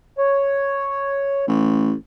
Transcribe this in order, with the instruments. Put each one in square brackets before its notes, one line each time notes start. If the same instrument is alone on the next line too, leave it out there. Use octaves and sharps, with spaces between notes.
[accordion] C#5
[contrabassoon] A1